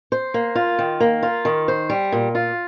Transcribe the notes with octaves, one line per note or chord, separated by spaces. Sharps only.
C5
A#3
F4
D#3
A#3
F4
D#3
C5
G3
A#2
F4